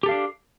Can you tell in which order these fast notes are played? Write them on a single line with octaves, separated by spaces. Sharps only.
G4 A4 F5 D4